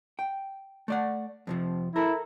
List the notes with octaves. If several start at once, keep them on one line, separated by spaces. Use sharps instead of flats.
G5
A3 D5 F#5
F2 C3 F3
E4 A4 A#4